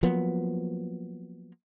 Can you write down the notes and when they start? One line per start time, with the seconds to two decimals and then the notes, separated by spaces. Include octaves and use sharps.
0.03 F3 F#3 A#3 B3